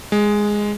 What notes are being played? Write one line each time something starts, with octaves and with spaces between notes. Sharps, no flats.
G#3